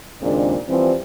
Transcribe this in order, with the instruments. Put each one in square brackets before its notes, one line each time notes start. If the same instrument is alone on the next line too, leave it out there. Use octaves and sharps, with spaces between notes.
[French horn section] D#2 A#2 C#3 G#3 C4 D4
E3 F3 G3 C4